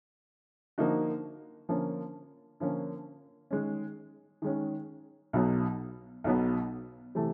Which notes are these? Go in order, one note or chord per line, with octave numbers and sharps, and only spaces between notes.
D3 F3 A#3 D#4 F#4
D3 F3 A#3 C#4
D3 F3 A#3 C#4
D#3 G#3 C#4
D#3 G#3 C#4
B1 B2 F#3 B3
B1 B2 F#3 B3
C3 E3 A3